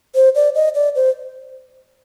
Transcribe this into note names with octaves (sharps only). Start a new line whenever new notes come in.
C5
D5
D#5
D5
C5